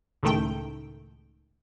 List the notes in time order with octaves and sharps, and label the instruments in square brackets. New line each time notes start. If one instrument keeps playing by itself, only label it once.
[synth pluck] C#2 A2 D#3 A3 G5